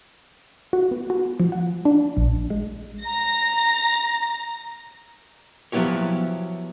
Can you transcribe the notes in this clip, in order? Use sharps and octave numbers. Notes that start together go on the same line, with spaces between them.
F#4
B3
F#4
F3
F#5
D4
A#1
G#3
A#5 A#6
F3 F#3 B3 E4 G4 C#5